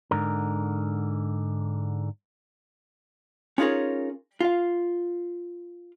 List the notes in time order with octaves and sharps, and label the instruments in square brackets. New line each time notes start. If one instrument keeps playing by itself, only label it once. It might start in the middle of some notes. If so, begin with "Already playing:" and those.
[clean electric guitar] G#2 D3 A#4
[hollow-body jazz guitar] C#4 D#4 F4 G#4 A#4 C#5
F4 F5